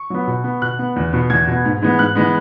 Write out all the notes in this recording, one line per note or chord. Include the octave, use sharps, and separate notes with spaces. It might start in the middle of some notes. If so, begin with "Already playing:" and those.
Already playing: C#6
F#3 B3
B2
B3
B2 F#6
B3
E2
B2 B3
E2 G#6
B2 B3
G#2
E3 G#3 B3
G#2 F#6
E3 G#3 B3